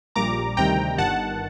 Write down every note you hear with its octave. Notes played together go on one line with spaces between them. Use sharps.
A#1 A#2 G3 A#5 D6
D2 C3 D#3 G3 G5 A#5
G1 G2 D#3 F#5 A5